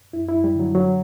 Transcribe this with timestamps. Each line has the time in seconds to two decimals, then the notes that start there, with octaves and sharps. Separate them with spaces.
0.13 F#2 E4
0.29 E4
0.34 F#2
0.44 G3
0.55 D3 F#3
0.75 D3 F#3